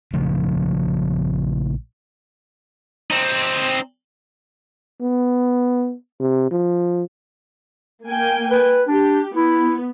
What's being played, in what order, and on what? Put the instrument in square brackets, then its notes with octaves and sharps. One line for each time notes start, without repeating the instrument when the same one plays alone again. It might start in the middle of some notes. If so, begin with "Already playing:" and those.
[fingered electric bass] A#1 C#3 F3 A3
[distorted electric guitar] C4 D#4
[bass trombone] B3
C3
F3
[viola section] A#3 G5 G#5
[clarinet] B4
[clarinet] D4 [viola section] G4
[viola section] B3 [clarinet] E4